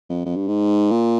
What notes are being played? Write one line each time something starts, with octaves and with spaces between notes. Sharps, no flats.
F2
F2
G2
G#2
A#2